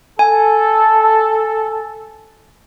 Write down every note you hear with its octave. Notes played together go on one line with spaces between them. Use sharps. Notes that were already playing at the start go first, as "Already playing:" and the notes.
A4 G#5